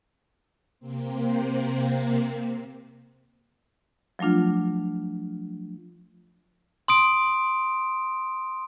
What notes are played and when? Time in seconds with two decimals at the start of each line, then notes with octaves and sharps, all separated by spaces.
0.79 C3 A#3 C4
4.19 F3 F#3 A3 D4 F4
6.88 C6 D#6 D7